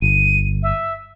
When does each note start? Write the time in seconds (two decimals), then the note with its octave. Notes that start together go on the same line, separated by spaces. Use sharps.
0.02 G1 D#7
0.63 E5